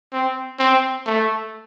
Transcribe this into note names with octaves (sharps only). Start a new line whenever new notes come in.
C4
C4
A3